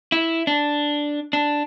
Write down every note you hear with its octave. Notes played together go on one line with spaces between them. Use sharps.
E4
D4
D4